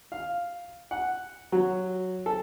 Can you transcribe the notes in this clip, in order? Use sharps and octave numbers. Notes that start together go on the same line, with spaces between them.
F5
F#5
F#3
A4